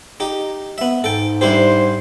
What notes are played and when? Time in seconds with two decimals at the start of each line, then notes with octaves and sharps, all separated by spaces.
0.20 D#4 G4
0.78 B3 E5
1.04 G#2 A4 G5
1.41 G2 E4 G4 C5